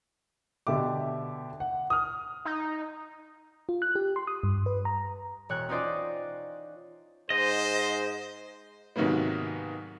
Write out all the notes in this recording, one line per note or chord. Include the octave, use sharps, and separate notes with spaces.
B2 D3 G4 E5 D6
F#5
D#6 F6
D#4
F4
F#6
G4
C6
D#6
G2
B4
A#5
E1 C#5 G5 F#6
C#4 D#4 F4 C5 D5 D#5
G#2 C5 D#5
G#2 C3 D#3 F#3 A#3 B3